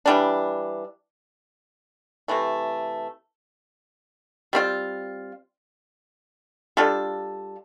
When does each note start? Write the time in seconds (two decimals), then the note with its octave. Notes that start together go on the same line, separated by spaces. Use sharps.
0.06 E3 G3 D4
2.28 C3 E3 A3
4.53 G3 C4 F4
6.77 G3 D4 F4 A4